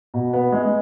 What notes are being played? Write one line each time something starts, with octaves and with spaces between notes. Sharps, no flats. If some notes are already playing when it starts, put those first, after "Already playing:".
B2
B3
G#3